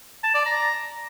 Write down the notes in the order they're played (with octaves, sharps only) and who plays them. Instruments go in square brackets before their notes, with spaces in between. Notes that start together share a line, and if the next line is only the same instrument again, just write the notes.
[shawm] A5
D5
A#5